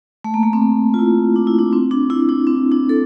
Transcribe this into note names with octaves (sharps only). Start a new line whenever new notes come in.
A3
A#3
A3
C4
A#3
F4
E4
D4
E4
D4
C4
D4
E4
D4
C4
D4
A4